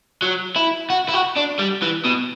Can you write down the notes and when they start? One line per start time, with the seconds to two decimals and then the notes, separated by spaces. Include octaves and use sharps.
0.22 F#3
0.56 E4
0.90 F#4
1.09 E4
1.14 F#4
1.36 D4
1.59 G3
1.82 E3
2.05 B2